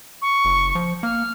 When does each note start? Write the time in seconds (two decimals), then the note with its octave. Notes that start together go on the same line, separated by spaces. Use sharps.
0.22 C#6
0.45 F#1
0.75 F3
1.03 A#3 F6